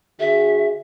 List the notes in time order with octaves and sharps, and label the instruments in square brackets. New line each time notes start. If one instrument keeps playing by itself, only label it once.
[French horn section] D3 F#4 G#4 [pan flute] E5